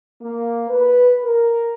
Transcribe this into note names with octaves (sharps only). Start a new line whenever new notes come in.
A#3
B4
A#4